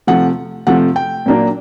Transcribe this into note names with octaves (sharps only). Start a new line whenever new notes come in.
C3 F3 A3 F#5
C3 F3 A3 F#5
G5
A#2 F#3 A#3 D4